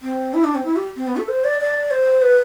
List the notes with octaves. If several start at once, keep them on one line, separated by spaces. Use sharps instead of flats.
C4
E4
D4
C4
E4
G4
C4
B3
A4
C5
D5
D5
C5
B4